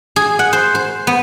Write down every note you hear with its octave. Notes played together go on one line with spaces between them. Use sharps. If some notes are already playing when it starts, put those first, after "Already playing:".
G#4
F#5
C5
C5
B3